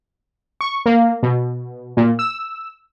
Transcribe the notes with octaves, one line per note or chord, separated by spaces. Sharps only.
C#6
A#3
B2
A#2
E6